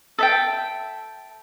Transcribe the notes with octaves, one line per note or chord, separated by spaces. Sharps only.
A4 E5 G5